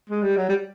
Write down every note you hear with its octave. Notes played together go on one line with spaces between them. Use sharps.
G#3
G3
F#3
G3